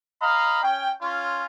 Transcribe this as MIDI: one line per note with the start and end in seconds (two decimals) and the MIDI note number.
0.21 0.61 75
0.21 0.61 77
0.21 0.61 82
0.21 0.61 83
0.63 0.92 61
0.63 0.92 79
1.02 1.45 61
1.02 1.45 65